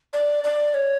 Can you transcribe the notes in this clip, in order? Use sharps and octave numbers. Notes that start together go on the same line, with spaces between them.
D5
D5
C#5